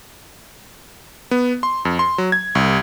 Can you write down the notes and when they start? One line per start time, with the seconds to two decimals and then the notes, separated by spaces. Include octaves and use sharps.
1.31 B3
1.63 C6
1.85 F2
1.99 C6
2.18 F#3
2.32 G#6
2.55 C2